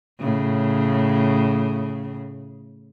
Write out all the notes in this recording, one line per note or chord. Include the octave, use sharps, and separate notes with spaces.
A2 C#3